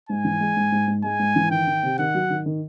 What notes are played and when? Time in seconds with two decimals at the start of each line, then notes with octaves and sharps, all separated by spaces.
0.09 G#2 G#5
0.24 E3
0.40 G#3
0.57 G#2
0.72 G#2
0.87 G#2
1.04 G#3 G#5
1.19 G#2
1.36 E3
1.51 D#3 G5
1.67 D#3
1.83 C3
1.99 D#3 F#5
2.14 F#3
2.30 D#3
2.46 D#3